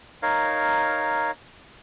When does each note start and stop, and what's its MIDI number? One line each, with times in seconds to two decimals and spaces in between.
0.23 1.31 63
0.23 1.31 70
0.23 1.31 73
0.23 1.31 77